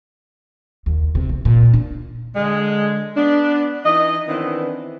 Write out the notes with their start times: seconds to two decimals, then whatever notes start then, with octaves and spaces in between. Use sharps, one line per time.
0.86 D#2
1.15 C3
1.29 D2
1.45 A#2
1.73 D4
2.35 D3 G#3
3.16 B3 D4
3.85 E3 D#4 D#5
4.27 D#3 E3 B3 C4 D4